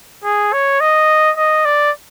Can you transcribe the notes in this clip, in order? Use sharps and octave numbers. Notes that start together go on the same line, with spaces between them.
G#4
C#5
D#5
D#5
D5